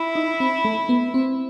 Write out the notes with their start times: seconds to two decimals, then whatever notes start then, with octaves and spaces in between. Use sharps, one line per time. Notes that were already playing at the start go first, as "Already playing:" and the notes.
Already playing: E4
0.15 D#4
0.40 C4
0.65 A3
0.89 B3
1.14 C4